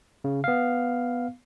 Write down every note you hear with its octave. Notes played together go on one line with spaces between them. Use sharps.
C#3
B3 F5